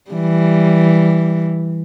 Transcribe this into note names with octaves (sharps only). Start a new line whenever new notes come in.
E3 G3